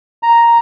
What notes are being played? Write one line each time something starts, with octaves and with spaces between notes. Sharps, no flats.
A#5